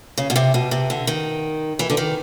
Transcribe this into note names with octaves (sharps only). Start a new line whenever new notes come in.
C#3
B2
C3
B2
C3
D3
D#3
E3
D3
D#3